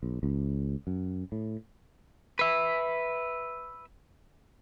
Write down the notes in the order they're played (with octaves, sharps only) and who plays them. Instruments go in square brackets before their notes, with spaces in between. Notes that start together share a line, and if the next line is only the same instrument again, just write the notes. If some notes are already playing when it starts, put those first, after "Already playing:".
[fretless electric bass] B1
C#2
F#2
A2
[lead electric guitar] B4 E5